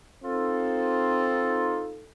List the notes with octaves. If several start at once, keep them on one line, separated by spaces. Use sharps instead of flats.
C4 D#4 F4 A4